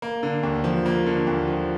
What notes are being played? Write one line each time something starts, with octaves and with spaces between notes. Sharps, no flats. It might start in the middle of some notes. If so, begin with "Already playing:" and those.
A#3
D3
D#2
F3
A#3
D3
D#2
F3